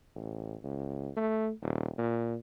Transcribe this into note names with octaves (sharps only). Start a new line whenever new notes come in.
A1
C#2
A3
D#1
A#2